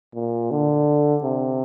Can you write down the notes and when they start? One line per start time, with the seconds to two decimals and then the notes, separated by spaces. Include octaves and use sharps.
0.15 A#2
0.51 D3
1.23 C3